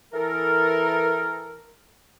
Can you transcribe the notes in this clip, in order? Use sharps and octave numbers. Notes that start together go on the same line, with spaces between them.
E3 A4 A#4